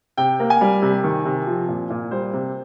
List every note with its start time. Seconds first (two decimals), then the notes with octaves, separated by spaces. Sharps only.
0.17 C3 G5
0.40 A#3
0.50 G#5
0.61 G3
0.82 C3
1.04 D#3
1.25 C3
1.47 F3
1.69 A#2
1.90 A#2
2.11 G3 C5
2.33 C3